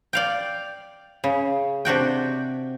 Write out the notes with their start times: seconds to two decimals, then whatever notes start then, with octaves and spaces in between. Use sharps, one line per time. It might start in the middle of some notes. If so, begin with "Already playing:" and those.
0.13 D5 F5 G5
1.24 C#3
1.85 C3 D4 F#4 G5